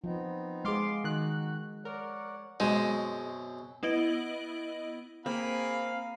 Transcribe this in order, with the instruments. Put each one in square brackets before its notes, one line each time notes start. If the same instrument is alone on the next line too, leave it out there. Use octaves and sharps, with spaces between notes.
[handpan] F3 [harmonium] B3 C4 D#4
[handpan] G#3 G#4 [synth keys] F5 C6 D6
[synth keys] D#3 F#6 [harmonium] F#4
[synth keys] A#4 [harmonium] C#5 D5 F#5
[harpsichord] F#2 B2 C4 [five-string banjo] G#3
[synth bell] B3 E4 D#5 D7 F#7
[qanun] A#3 [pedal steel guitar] C4 A#4 [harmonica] G#4 G#5 B5 [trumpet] F5